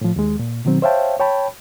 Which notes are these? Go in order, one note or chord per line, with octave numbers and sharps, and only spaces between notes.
A2 F3
D#2 G#3
A#2
B2 D#3 F#3 C4
C5 C#5 E5 F5 G5 A5
C#5 G5 A5 B5